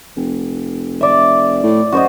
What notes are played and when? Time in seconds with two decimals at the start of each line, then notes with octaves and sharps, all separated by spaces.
0.16 F1
1.01 D5 E5
1.63 A2
1.92 F#2 F#4 C5 D#5